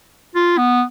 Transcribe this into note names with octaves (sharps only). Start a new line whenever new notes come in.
F4
B3